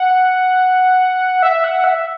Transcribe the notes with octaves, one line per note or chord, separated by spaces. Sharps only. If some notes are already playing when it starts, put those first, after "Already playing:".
Already playing: F#5
E5
F#5
E5